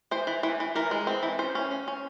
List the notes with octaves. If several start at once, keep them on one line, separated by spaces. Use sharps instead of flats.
E3 C5
E3
E3
E3
E3 A#4
G#3
C4
E3
C#4 C5
C#4
C#4
C#4